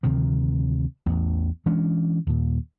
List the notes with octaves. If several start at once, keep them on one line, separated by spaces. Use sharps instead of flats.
D2 C3 D#3 F3
A1 E2
E3 G#3 C#4 D4
D#2 A#2